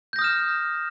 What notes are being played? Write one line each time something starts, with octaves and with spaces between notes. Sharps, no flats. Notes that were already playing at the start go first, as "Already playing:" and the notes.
D#6 F6 G6 A#6 E7